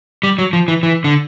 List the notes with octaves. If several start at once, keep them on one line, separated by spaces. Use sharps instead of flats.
G3
F#3
F3
E3
E3
D3